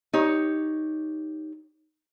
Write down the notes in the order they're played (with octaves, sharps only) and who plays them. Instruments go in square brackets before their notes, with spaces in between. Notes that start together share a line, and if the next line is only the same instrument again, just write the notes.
[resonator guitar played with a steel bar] D#4 G4 C#5